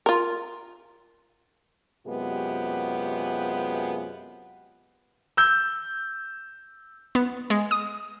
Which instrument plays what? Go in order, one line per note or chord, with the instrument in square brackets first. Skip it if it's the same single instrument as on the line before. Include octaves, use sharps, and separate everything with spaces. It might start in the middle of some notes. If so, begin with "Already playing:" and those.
[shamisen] F4 A#4
[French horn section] F#2 C3 G#3 B3 F4 G4
[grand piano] E6 G6
[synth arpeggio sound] B3
G#3
D#6